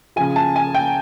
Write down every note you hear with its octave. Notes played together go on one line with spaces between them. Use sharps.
C#3 F3 G#5
A5
G#5
G5